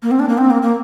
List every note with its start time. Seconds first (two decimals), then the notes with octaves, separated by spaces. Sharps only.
0.03 A#3
0.11 C4
0.20 D4
0.29 A#3
0.38 C4
0.51 A#3
0.62 A#3